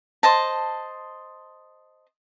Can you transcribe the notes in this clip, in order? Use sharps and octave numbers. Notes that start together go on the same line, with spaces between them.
C5 D#5 A5